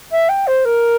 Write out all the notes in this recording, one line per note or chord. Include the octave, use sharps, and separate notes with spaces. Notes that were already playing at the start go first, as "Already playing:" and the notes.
E5
G5
C5
A#4